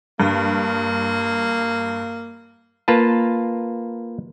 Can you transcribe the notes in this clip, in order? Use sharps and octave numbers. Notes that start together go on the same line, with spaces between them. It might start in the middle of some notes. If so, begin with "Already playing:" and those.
G2 A#3
A#3 F4 B4 A5